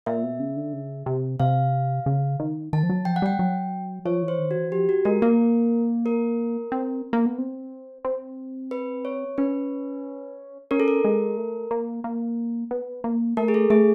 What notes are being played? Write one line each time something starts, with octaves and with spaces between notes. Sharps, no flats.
A#2 E5
B2
C#3
D3
C#3
C3
C3 F5
C#3
D#3
D#3 A5
F3
F#3
F3 G5
F#5
G3 G5
F#3
F3 C#5
E3
C5
D#3
F#4
E3
F3 G4
F#4
G#3 A#4
A#3 A#4
A#4
C4
A#3
B3
C4
C4
B4
C#5
C#4 B4
C#4 A#4
A4
A#4
G#3
A3
A#3
A#3
B3
A#3
A3 A#4
G#4
A4
A3 G#4